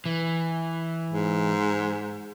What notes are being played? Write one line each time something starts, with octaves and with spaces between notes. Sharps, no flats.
E3
G#2